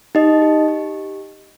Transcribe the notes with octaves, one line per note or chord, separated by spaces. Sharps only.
D#4 G4 D#5
G4
G4